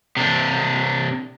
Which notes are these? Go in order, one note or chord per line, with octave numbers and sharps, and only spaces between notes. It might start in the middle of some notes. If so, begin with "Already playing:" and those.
C3 D4